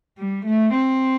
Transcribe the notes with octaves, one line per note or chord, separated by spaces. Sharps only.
G3
A3
C4